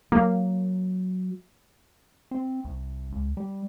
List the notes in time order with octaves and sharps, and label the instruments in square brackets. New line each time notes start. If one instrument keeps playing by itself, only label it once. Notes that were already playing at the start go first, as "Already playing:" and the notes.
[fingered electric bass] F#3 [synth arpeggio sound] A#3
[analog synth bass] C4
C2
C#2
G3